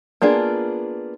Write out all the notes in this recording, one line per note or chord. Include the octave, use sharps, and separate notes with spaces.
A#3 B3 D4 F4 G#4